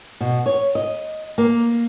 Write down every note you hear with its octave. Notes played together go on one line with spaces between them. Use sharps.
B2
C#5
D#5
A#3